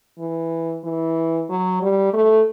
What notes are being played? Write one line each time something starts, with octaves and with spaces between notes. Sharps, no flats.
E3
E3
F#3
G3
A3